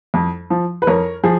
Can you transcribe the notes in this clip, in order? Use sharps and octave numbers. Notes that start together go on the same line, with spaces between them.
F2
F3
B4
F2 A#4 C#5
F3 G#4